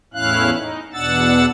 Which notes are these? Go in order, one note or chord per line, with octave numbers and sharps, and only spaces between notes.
E2 A2 C#4 E4 F5 F#6
D#4
E2 B2 D4 F#5 E6 A6